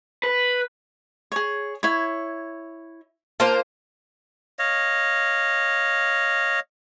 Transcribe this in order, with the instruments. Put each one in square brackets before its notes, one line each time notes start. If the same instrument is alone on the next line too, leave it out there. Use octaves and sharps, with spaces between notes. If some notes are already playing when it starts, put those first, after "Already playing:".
[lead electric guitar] B4
[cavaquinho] G#4 C#5
E4 C#5
[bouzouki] A#3 F4 C5 [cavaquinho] A5
[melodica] C#5 D#5 F5